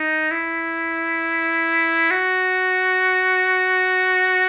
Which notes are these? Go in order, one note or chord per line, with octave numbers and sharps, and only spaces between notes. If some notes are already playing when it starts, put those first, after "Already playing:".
Already playing: D#4
E4
F#4